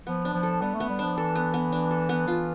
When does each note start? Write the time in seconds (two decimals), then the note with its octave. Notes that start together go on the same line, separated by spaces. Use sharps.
0.06 F3 B3
0.25 D4
0.34 F3
0.43 A4
0.62 G3 B3
0.75 A3
0.80 B3
0.90 G3
0.99 F3 D4
1.18 E3 A4
1.36 B3
1.54 B3
1.72 D4
1.91 A4
2.09 B3
2.28 E3 F4